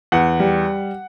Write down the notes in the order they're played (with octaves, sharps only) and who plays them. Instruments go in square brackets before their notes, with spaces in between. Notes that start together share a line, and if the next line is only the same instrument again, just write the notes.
[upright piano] E2 F#5
G3